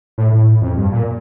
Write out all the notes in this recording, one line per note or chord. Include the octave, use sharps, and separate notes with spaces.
A2
A2
F2
G2
A#2